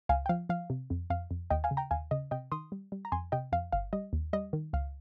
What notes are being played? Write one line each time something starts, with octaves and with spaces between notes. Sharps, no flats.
C#2 F5 G#5
G5
F3 F5
F3 F5
C3
F2
F2 F5
F2
D#2 D#5 G5
F5 G#5
C#3
G5 A#5
D#2 F5 G#5
C#3 D#5
C3 D#5 G5
D#3 C6 D#6
G3
G3
A#5
F2 G#5 C6
C3 D#5 G5
F2 F5
G1 F5
G3 D#5
D#2
G3 D#5
D#3
C#2 F5